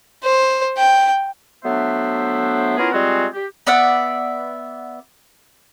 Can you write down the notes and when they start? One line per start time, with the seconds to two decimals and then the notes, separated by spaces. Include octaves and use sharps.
0.23 C5
0.77 G5
1.64 F#3 A3 B3 D4 C5 E5
2.78 B3 C#4 E4 F4 G#4 A#4
2.92 G3 G#3 C4 F4 F#4 G#4
3.34 G4
3.67 B3 D5 E5 F#5